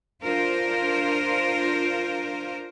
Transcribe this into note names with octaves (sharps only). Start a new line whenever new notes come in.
D4 F4 A#4 C5